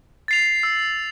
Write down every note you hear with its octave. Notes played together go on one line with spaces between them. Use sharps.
A6 C7 F7
E6